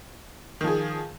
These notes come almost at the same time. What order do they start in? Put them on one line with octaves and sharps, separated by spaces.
D#3 F3 G#4